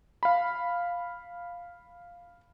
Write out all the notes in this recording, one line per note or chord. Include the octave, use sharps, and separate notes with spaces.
F5 B5